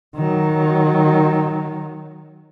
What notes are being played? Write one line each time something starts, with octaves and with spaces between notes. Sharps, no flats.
D#3 F#3